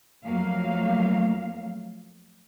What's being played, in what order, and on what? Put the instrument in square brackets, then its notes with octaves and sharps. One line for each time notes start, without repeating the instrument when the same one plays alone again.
[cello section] F2 F#3 A3 A#3 F5